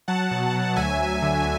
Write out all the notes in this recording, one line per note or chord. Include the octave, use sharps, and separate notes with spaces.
F#3 F#5 A5
B2
F#3
D2 E5 G#5
D2
D3